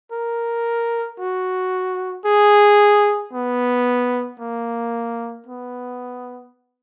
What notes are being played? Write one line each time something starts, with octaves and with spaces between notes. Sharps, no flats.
A#4
F#4
G#4
B3
A#3
B3